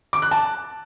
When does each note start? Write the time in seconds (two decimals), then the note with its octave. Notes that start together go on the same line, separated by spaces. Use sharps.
0.13 D6
0.22 F#6
0.31 A5